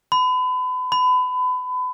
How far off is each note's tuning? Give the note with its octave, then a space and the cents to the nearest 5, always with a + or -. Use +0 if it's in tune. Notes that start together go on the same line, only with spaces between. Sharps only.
B5 +35
B5 +30